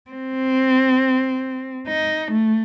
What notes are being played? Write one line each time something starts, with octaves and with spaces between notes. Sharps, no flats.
C4
D#4
A3